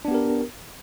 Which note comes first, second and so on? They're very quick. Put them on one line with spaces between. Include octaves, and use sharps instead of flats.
D4 B3 G4 A#4